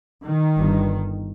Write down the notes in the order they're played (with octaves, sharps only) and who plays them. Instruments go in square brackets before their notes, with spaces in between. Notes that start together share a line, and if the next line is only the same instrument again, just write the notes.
[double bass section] D#3
G1 G2